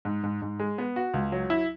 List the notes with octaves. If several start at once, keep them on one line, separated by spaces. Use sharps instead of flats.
G#2
G#2
G#2
G#3
B3
F#4
C#2
F#3
E4